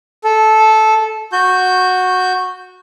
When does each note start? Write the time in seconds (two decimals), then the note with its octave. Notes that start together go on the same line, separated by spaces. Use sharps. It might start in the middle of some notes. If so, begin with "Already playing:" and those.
0.24 A4
1.33 F#4 G6